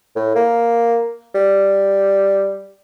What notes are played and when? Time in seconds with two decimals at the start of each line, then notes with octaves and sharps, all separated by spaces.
0.16 A2
0.35 A#3
1.35 G3